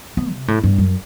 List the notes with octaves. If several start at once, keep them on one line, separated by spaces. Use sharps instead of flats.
B3
C3
A2
G2
F#2